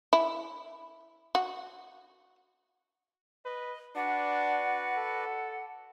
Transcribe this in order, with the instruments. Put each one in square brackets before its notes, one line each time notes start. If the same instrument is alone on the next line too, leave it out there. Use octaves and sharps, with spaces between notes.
[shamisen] E4
F#4
[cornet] B4 [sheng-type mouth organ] D#5
[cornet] D4 [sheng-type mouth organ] F#4 B4 D5 [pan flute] F#5
[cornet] A4